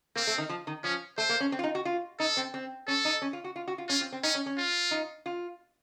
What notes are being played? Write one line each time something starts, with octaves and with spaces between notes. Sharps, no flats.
A#3 C4
A3
D#3
F3
D#3
F3 C#4
A3 C5
A#3
C#4
C4
F4
D#4
F#4
F4
D#4 A4
C4
C4
C#4 A4
D#4
C#4
F4
F#4
F4
F#4
F4
C#4 F4
C4
C4
C#4 D#4
C#4
C#4
F4
D#4
F4